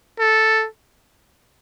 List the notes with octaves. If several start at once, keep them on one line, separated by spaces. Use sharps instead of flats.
A4